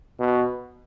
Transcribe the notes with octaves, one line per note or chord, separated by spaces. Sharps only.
B2